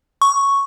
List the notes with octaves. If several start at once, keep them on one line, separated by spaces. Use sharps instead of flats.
C#6